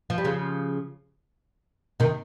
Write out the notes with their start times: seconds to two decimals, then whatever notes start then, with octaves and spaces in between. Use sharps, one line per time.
0.10 F3
0.18 G3
0.25 C#3 F3
2.00 C3 D#3